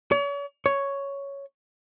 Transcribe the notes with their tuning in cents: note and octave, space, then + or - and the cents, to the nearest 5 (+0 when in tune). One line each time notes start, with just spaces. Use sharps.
C#5 +40
C#5 +5